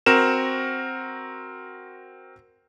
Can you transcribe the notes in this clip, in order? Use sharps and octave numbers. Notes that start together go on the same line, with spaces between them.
C4 F#4 A#4 E7